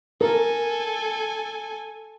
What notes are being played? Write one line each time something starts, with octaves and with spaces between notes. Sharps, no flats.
A4 A#4 G#5